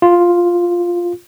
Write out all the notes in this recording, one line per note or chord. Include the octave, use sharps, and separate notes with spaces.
F4